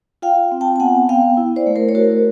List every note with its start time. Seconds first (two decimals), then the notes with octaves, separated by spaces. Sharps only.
0.22 F4 F5 G5
0.52 C4
0.61 G5 A5
0.76 A5
0.80 B3 F#5 G#5
1.09 B3 F5 G5
1.37 E4
1.56 C5 D5
1.67 A3
1.76 A#4 C5
1.89 C#5
1.95 F#4 A#4 C5